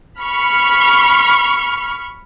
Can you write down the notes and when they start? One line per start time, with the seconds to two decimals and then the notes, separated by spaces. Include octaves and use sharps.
0.20 B5 C#6 F6